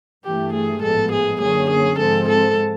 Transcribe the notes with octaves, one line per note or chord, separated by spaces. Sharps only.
G2 E3 A3 G4
G#4
A1 G#2 F3 G#3 B3 A4
G#4
F#2 D3 F#3 A#3 C#4 G#4
G#4
G#2 F3 G#3 C4 A4
A4